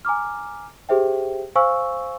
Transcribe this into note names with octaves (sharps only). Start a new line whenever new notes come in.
G#5 A#5 D6 F6
G4 G#4 C5 E5 G5
C5 F5 G#5 C#6 E6